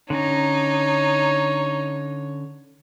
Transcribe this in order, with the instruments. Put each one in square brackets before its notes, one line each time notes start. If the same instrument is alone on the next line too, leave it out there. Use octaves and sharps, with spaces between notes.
[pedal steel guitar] D3 C#4 A#5 [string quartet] D#4 [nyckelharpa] C#5